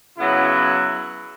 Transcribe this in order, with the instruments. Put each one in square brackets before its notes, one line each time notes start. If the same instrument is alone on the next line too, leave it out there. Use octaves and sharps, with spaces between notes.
[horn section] C#3 F#3 B3 E4